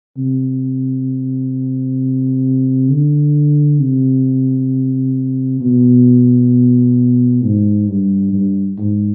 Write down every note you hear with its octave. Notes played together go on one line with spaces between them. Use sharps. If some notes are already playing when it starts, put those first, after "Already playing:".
C3
D3
C3
B2
G#2
G2
G2
G#2